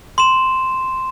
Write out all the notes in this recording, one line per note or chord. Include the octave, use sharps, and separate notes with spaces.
C6 E7